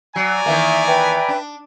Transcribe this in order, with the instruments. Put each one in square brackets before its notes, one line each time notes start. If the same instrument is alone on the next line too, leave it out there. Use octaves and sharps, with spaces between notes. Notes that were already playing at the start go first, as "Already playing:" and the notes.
[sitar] F#3 [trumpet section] D5 G#5 A#5
[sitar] D#3 E3 A#3 [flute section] E5
[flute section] B4 E5 G5
[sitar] D4